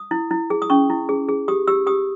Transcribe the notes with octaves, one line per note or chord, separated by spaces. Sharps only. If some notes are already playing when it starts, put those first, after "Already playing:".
Already playing: D#6
E4
E4
G#4
D#6
C#4 C#6
E4
G#4
G#4
G4 D#6
G4 E6
G4 D#6